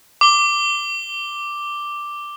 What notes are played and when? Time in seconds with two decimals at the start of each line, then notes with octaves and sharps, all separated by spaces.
0.21 D6 G7